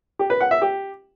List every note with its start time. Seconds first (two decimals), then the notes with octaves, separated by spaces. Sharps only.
0.19 G4
0.30 B4
0.41 F#5
0.51 E5
0.62 G4